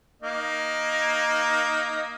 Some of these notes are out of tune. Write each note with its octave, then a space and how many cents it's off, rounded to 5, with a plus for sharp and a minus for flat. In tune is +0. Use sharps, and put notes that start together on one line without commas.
A#3 +15 D#4 +0